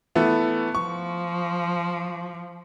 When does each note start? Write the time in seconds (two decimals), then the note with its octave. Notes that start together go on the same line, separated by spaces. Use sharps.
0.15 E3 A3 B3
0.75 F3 C#6